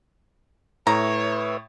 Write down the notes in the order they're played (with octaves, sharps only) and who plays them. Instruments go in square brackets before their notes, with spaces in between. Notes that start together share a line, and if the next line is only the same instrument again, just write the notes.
[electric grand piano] A2 [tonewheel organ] B4 E5 [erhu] C#5 [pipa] A#5